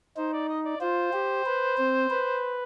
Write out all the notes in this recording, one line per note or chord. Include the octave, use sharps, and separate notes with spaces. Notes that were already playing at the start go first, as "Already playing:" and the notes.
D#4 C5
D5
D#5
D5
F4 C5
G4
B4
C4
B4